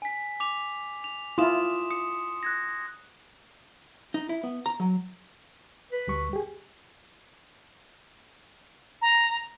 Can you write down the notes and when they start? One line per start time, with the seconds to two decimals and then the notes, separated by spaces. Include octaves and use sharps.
0.02 G#5 B6
0.40 D6 F7
1.04 F7
1.38 E4 F4 C6 D#6 E7
1.91 D#6 C#7
2.43 F#6 G#6 A#6
4.14 D#4
4.29 E4
4.44 B3
4.66 A#5
4.80 F#3
5.92 B4
6.07 D2 G3 C#6
6.33 G4 G#4
9.02 A#5